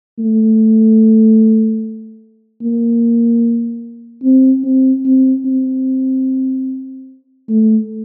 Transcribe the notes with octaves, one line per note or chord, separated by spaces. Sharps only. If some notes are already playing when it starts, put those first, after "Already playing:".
A3
A#3
C4
C4
C4
C4
A3